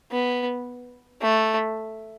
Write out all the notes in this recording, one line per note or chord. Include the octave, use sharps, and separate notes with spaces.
B3
A3